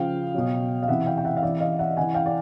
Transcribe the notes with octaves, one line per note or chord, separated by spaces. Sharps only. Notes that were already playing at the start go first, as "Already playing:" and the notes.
Already playing: C#3 F3 F5 G5
B2 F#3
F5
C3 E3 E5 F#5
F5 G5
G5
E5 F#5
F5
C3 E3 D5 E5
D#5 F5
E5 F#5
C3 E3 F#5 G#5
F5 G5
D5